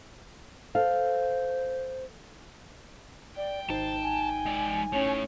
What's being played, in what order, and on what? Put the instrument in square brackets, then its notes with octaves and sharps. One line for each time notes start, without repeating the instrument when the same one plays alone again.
[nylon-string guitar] A4 F5 [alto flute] C5
[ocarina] D5 [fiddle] G5
[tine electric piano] G#1 D#4 [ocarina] C5 [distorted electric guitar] A5
[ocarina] G#5
[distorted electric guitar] G#3 D5
[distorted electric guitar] A2 [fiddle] C#4